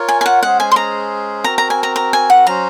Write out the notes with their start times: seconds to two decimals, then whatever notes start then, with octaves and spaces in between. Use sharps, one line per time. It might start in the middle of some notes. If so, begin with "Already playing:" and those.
Already playing: F4 A#4 C#5
0.08 G#5
0.21 G#5
0.26 F#5
0.42 G#3 C#4 G#4 C5 F#5
0.60 G#5
0.72 C6
0.76 A#5
1.44 C4 F#4 A#4 A#5
1.58 A#5
1.70 G#5
1.83 A#5
1.96 A#5
2.13 G#5
2.30 F#5
2.46 F#3 C#4 F#4 C5 A#5